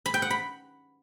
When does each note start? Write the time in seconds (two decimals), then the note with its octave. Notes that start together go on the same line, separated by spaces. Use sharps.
0.06 B5
0.14 G5
0.22 F#5
0.31 B5